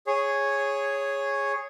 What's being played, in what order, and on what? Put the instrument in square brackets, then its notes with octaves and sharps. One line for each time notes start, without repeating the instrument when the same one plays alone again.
[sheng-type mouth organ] G#4 C#5